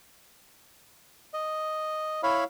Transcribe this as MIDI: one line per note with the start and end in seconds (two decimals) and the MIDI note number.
1.34 2.21 75
2.23 2.44 64
2.23 2.44 73
2.23 2.44 77
2.23 2.44 83